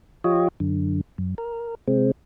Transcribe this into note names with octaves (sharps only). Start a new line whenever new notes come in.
F3 F4 G4 C#5 D#5
F#2 D3
F#2
A#4
C3 G#3 C4